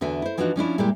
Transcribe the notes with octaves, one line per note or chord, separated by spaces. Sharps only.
E2 D3 F#4 E5 G#5
E4 C5
E3 F3 D4 D#4 F4 F#4
F3 C#4 D4 E4
A#2 G3 G#3 E4 G4